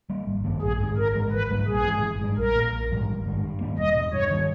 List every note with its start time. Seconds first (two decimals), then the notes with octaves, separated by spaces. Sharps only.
0.10 G3 A#3
0.27 G#1
0.44 G2 D#3 A#3
0.62 A#1 G#4
0.80 G#2 D#3
0.97 G#1 A#4
1.15 G#2 E3 G#3
1.32 G#1 B4
1.50 G#2 G3 A#3
1.68 A#1 G#4
1.85 G#2 E3
2.03 G#1
2.19 G#2 G3
2.38 A#1 A#4
2.55 A#2 A#3
2.73 A#1
2.90 G#2 E3 G3
3.08 G#1
3.26 G#2 D#3 G3
3.44 G2
3.60 D#3 G3 A#3
3.79 E1 D#5
3.96 E2 B2
4.13 G2 C#5
4.30 D#3 G3